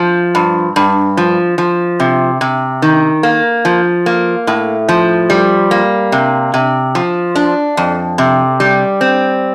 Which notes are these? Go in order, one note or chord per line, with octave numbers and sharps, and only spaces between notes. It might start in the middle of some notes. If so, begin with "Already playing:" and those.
Already playing: F3
G2
G2
F3
F3
C3
C3
D#3
A#3
F3
A#3
A2
F3
G3
A#3
C3
C3
F3
D4
F2
C3
G3
C4